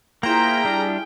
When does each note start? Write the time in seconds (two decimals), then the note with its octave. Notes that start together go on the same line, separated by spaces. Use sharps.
0.23 A#3 E4 F4 G#4 C5 G5 A#5
0.64 G3 D4